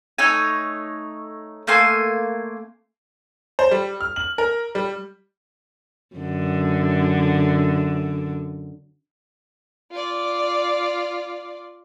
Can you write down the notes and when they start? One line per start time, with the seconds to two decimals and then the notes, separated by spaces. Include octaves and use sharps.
0.18 A3 D#4 C#5 G#5
1.67 A3 A#3 G#5 C6
3.59 C5
3.71 G3
4.01 F6
4.16 F#7
4.38 A#4
4.75 G3
6.16 F#2 D3
9.92 F4 D5